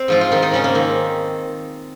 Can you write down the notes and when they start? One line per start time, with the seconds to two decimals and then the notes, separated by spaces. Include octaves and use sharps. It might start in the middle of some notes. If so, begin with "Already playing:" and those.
Already playing: C4 C5
0.08 G#2 F3 F4
0.21 F4
0.32 D#3 F3 D#4
0.42 D#3 D#4
0.52 G#2 C#3 C#4
0.64 A#3
0.75 D#3 C4